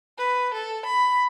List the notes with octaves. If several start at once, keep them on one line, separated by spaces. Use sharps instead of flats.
B4
A4
B5